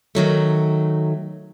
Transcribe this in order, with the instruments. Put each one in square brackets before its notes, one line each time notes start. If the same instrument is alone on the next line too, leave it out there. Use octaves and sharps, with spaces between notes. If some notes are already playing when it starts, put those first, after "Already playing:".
[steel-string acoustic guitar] D#3 F#3 A3